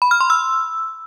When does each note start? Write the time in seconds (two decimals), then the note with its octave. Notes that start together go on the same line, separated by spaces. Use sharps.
0.02 B5
0.11 F6
0.21 C6
0.30 E6